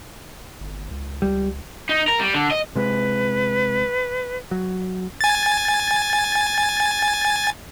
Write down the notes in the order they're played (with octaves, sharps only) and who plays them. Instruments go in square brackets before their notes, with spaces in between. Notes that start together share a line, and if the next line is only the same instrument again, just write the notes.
[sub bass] G1
C#2
[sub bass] C#2 [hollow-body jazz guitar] G3
[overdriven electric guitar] D#4
A#4
G3
D3
D#5
[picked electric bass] C3 G#3 [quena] B4
[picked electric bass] F#3
[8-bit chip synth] G#5 A6